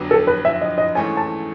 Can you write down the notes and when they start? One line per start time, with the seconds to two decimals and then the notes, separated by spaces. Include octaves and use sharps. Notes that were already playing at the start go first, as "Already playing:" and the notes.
Already playing: F2 D3 F#3 B3 D4
0.11 A4
0.27 B4
0.45 E5
0.61 D#5
0.78 D#5
0.95 G#2 E3 A3 C#4 G#5
1.17 A5